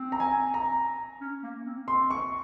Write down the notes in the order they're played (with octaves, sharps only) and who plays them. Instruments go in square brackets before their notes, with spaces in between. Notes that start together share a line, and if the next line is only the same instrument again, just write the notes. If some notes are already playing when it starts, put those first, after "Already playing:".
Already playing: [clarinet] C4
[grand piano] A#5
G#5
A#5
[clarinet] C#4
A#3
C4
[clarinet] C4 [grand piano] C6
[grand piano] C#6